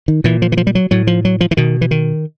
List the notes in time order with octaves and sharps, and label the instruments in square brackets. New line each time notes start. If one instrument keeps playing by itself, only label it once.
[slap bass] D#3
A#2 E3
F3
E3
F3
G3
F#3
A2 F#3
F3
F#3
F3
E3
B2 D#3
E3
D#3